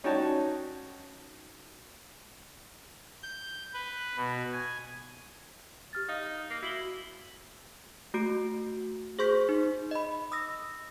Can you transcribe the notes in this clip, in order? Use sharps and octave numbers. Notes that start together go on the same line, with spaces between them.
C#4 D#4 F#4 C#5 G5 A5
G6
B4
B2
G#5
G4 F6 A6
D#4 F5
A#3
E4 F#4 F#7 G7
A3 F#4 D7
G#4 C5 C6 C#6 G6 B6
D#4
D#5 B5
D#6 E6 A#6